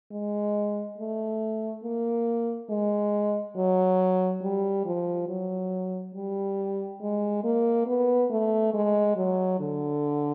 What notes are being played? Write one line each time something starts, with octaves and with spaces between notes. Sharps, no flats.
G#3
A3
A#3
G#3
F#3
G3
F3
F#3
G3
G#3
A#3
B3
A3
G#3
F#3
D3